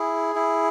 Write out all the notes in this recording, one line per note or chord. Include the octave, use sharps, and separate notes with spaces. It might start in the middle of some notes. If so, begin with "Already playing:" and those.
Already playing: E4 G#4
E4